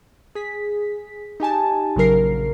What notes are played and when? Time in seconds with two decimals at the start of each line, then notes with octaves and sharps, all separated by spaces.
0.35 G#4 B6
1.40 D#4 G4 G#5 A5
1.96 A#1 C#3 F#3 A#4 C7